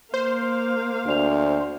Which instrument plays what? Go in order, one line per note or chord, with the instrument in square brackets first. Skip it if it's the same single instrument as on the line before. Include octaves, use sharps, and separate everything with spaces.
[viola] A#3 F5 [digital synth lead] C5
[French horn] D2 [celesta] D4 D5 F7